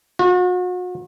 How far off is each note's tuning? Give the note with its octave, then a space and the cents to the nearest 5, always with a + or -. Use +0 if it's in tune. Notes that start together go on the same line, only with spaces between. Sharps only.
F#4 -40